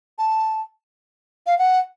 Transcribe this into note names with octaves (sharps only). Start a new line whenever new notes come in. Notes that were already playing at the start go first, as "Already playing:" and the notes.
A5
F5
F#5